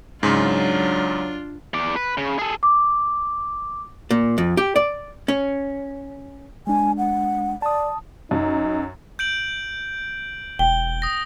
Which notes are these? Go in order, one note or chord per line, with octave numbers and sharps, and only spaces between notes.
G#2 C#3 F#3 D4 F4 C6
E2 D5
B4
C#3
G#4 A4
D6
A#2
F2
G4
D5
C#4
G#3 D4 G#5
F#5
D5 A5 D#6
F#2 D#4
G6 D7 F#7
E1 G5 G7
D#6 A#6